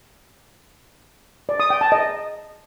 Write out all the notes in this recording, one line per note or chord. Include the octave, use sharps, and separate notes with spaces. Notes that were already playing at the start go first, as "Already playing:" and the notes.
D5
D#6
G5
A5
D#5